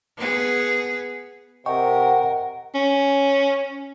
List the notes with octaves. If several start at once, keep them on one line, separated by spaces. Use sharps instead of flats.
B3 G#4
C3 A#4 D#5 F#5 G5 C#6
C#4